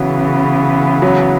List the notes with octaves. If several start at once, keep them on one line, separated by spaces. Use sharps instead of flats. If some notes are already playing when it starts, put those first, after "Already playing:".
Already playing: C#3 E3 F#3 B3
F#3